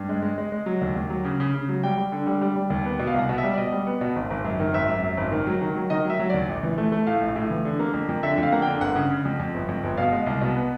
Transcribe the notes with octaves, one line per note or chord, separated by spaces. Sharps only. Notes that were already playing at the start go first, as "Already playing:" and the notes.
Already playing: G2
G#3
G#3
G#3
G#3
F#3
D#2
D#2
F#3
C#3
C#3
C#3
F#3
G3 G5
G3
D3
G3
G3
G3
D#2
B3
B2
F5
C2 F#5
B2
E5
G3
D5
B2 D#5
G3
B3
B2
G#1
G#1
F#2
D#3
G#1 E5
F#2
F#2
G#1
D#3
F#3
D#3
F#3
D#3 D#5
F#3 E5
F#3
D5
D#2
A#1
E3
A3
A3
A2 F5
A#1
A2
E3
D3
A#3
F2
F2
D3 E5
F2 F5
A#3 F#5
G5
D3
G1 F#5
C#3
C#3
F2
F2
G1
F2
G1
B2 F5
G#3
C2
B2
B3